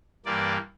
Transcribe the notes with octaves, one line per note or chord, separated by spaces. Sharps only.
G2 E3 A#3 D5